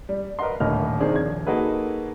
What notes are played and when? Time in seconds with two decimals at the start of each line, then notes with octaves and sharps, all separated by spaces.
0.09 G3
0.39 A#4 B4 D#5 F#5 C6
0.60 D#1 A2 D3 D#5 F6
1.00 C3 D#3 D4 G#4 C5
1.14 D#1 A#1 G#6
1.47 A#3 D#4 F#4 G#4 A4 B4